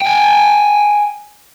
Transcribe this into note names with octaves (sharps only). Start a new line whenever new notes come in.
G5 G#5